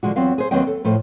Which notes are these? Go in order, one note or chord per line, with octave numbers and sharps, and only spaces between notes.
D3 F3 G#3 F#4
E2 F#3 B3 C4 F4 F5
G#4 C5
D#2 F#3 B3 C4 D#5 G5
A4
A2 F3 A4